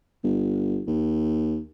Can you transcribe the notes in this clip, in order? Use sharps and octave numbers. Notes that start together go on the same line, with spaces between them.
G1
D#2